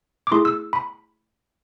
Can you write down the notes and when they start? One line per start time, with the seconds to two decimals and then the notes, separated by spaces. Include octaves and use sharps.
0.27 D6
0.31 A3 E4 G#4 C6
0.45 E6
0.73 B5